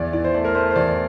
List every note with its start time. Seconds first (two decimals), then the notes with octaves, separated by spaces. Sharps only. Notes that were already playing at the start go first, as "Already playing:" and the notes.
Already playing: E2 D5
0.13 E3 D5
0.24 C5
0.34 A3 D5
0.44 A#4
0.55 A3 C5
0.71 C5
0.76 E2 D5